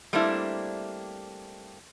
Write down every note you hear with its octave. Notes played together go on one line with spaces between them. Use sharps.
G3 A3 A#3 C4 D4 E4